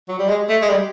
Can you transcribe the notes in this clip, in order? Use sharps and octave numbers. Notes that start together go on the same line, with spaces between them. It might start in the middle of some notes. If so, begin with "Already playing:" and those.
F#3
G3
G#3
A3
G#3
G3